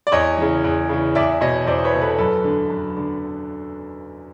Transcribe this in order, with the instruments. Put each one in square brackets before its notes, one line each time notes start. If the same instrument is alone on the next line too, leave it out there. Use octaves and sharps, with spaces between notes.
[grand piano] D5
E2 C#5 D#5
C#3 E3
E2
C#3 E3
E2 D5 E5
B2 C#5 D#5
E2 C5 D5
C5
B4 C#5
B2
A4 B4
F#2 A4 B4
D3
F#2
D3